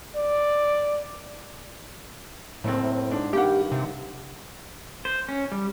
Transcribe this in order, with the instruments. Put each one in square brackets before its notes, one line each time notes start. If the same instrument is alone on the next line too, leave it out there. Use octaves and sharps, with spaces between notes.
[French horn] D5
[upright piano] F#1 C4 [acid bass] A2
[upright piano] G#2 D4
[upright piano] G2 D#3 F#5 [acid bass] G4
[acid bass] C3
[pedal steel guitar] C5
C#4
G3